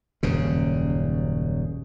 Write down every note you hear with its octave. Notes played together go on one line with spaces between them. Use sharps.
D#1 F#2 C#3